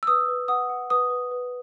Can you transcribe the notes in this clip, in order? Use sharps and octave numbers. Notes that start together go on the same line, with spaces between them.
E6
B4 D#6
B4
F#5 D#6
F#5
B4 D#6
B4
B4